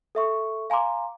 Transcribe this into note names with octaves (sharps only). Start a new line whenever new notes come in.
A4 E5 C#6
F5 G#5 A#5 C6 D6